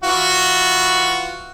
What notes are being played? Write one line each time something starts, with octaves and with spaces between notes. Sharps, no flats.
E3 F4 F#4